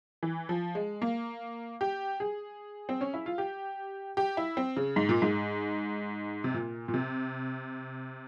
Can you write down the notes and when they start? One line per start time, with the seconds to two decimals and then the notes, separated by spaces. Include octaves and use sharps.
0.23 E3
0.49 F3
0.75 G#3
1.02 A#3
1.81 G4
2.20 G#4
2.89 C4
3.01 C#4
3.14 E4
3.26 F4
3.38 G4
4.17 G4
4.37 E4
4.57 C4
4.77 C#3
4.96 G#2
5.09 A#2
5.22 G#2
6.44 C3
6.54 A#2
6.88 A#2
6.94 C3